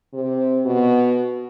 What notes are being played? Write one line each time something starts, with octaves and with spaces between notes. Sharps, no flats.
C3
B2